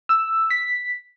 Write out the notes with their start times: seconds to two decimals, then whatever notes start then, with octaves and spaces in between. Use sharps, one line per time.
0.09 E6
0.51 B6